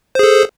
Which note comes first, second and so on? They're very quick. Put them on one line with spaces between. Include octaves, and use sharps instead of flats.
C5 G#4 A4